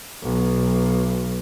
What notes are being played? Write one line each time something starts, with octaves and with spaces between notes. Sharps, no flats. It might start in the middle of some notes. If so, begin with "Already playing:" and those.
B1